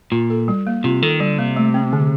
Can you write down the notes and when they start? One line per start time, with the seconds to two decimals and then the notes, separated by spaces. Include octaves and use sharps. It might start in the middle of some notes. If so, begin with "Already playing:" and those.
0.12 A#2 F4
0.30 A4
0.48 G3
0.67 A#3
0.84 C3 F4
1.02 D#3 A4
1.20 D3 G3
1.38 C3 A#3
1.56 A3
1.74 C4
1.93 D3